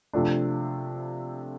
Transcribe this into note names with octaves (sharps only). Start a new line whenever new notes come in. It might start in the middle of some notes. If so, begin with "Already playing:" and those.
C3 F3 A3 D4